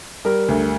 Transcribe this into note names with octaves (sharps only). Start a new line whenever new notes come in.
G3 A#4
D2